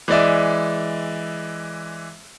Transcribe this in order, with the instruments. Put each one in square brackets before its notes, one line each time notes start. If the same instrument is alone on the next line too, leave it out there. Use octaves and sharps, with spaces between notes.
[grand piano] E3 G#3 D5 E5